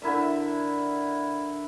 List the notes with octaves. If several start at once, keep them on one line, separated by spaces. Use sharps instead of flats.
D3 E4 A#4 E5